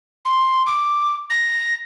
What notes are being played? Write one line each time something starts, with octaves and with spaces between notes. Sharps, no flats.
C6
D6
A#6